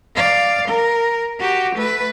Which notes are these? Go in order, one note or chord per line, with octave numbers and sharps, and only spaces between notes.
D5 F5
A#4
F#4 G4
A3 B4